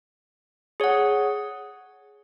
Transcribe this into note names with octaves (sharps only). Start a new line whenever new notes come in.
G#4 C#5 F#5